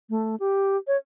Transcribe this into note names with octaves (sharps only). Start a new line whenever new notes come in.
A3
G4
C#5